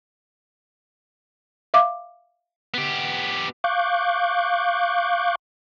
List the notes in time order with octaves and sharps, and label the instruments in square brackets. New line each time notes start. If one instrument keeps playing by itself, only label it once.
[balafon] E5 F5 D6
[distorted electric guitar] B3 G4
[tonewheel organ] F5 C#6 D6 F#6 G6